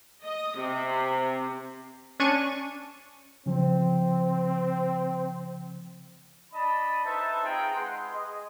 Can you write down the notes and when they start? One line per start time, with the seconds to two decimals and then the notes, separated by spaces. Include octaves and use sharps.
0.23 D#5
0.56 C3
2.20 C#4 D4 C#6 D#7
3.46 C#3 F3 C4
6.53 D4 D#5 A5 B5
7.04 D#4 A4 B4 C5 E5 A5
7.43 C4 D#4 F4 G#4 G5 A#5
7.75 G#3 G#4 B4 F#5 C6
8.13 G#4 D#5